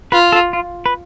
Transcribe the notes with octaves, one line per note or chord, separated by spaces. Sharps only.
F4 B4
A4
F4
B4